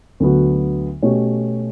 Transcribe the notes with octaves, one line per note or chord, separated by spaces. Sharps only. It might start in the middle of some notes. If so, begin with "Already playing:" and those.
D2 D3 F#3 B3 F#4
B2 A3 C#4 G4 C#5